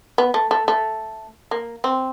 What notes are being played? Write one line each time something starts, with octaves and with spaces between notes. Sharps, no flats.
B3
A3
A3
A3
A#3
C4